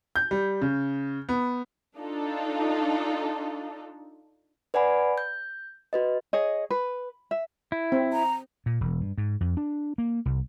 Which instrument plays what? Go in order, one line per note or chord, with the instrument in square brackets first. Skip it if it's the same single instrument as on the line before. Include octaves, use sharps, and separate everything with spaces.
[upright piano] G6
G3
C#3
B3
[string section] D4 D#4 F4 A4
[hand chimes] B4 D5 F#5 G#5 B5
G6
F#4 B4 D#5
[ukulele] G#4 C#5 D#5
B4
E5
[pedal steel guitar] E4
[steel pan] C4
[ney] A#5
[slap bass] A#2
E1
G2
G#2
F2
D4
A#3
C2